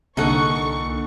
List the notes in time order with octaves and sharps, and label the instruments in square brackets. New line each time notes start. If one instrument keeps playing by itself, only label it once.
[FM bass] C2 [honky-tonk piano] A#2 D3 [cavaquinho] D#4 A4 F#5 [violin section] C#6